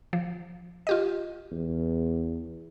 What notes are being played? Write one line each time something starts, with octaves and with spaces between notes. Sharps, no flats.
F3
F4 G4 D#5
E2